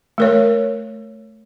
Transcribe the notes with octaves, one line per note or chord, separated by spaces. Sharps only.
A3 A#4 C#5